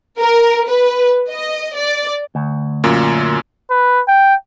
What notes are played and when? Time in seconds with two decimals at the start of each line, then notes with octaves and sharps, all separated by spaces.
0.20 A#4
0.68 B4
1.29 D#5
1.76 D5
2.35 D2
2.84 F#2 A#2
3.70 B4
4.08 G5